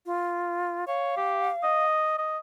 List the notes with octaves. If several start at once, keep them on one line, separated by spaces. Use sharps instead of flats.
F4
C#5 F5
G4
D#5
D#5